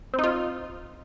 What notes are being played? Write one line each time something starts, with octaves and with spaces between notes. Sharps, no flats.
C4
D#4
F4